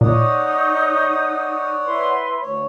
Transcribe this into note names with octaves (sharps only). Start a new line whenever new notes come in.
A#2 D#4 C#5 D5 F#5 D#6
E4 B4 C6
D2 C#5